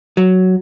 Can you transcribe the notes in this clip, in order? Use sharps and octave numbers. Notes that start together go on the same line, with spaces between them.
F#3